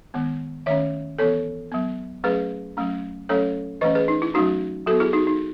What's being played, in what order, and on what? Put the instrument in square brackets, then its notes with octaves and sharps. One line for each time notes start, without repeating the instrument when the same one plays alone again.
[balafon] D#3 G#3 B3
D#3 A3 C#4 C#5 E5
E3 B3 A4 C#5
F#3 B3
F#3 A3 C#4 G#4 B4
F#3 A3 C#4
F#3 A3 C#4 A4 C#5
E3 A3 C#4 B4 D#5
G#4 B4
D#4
E4
F#3 A3 C#4 D#4 F#4
F#3 B3 F#4 A4
E4 G#4
D#4 F#4
D#4